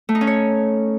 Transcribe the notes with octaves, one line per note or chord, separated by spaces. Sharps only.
A3
D#4
C#4
C#5